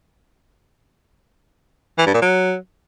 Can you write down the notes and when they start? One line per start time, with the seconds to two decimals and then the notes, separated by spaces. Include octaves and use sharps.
1.98 E3
2.06 G2
2.14 A#2
2.22 F#3